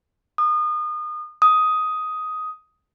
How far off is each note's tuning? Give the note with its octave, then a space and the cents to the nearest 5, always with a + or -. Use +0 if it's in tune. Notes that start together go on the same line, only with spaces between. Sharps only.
D#6 -30
D#6 +10